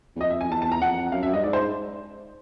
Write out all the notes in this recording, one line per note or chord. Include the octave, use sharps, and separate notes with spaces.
E2
F2 D#5
E5
G#5
F2
E2 A5
A5
A#5
F2 F#5
F#2 F5
F#2 E5
G2 D#5
G#2 D5
C5